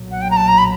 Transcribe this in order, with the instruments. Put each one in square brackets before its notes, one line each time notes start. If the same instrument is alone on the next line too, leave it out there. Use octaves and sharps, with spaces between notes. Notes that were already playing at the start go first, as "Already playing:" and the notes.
Already playing: [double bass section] B1 A#2 F#3
[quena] F#5
G5
A#5
A5
A#5
B5